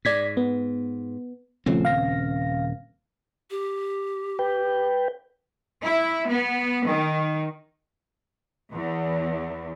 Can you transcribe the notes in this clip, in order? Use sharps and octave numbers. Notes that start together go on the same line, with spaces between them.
G#2 D5 G#6 B6
B3
D#1 C#3 F3 A3 C4 C#4
F5 A#6
G4
B4 G5
E4
B3
D#3
E2